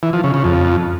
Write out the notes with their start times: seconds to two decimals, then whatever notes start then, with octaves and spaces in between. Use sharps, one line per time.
0.03 E3
0.13 F3
0.24 C#3
0.34 C#3
0.44 F2